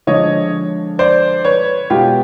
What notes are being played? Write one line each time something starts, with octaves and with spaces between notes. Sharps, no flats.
D3 F3 G#3 C#5 D#5
C5 D5
B4 C#5
B2 G#3 B3 F4 G4